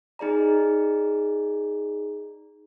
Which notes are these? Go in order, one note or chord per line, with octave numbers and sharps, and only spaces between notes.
D#4 G#4 D5 A#5